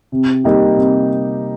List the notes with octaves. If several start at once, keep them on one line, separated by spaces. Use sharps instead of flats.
C3
G3 A#3 D#4 G4
C3